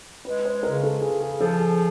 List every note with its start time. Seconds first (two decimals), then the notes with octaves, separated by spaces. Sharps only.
0.25 G#3 B4
0.45 C5
0.63 C#3 A#4
0.83 A4
1.01 C#3 G#4
1.21 G#4
1.41 F3 A4
1.59 G#4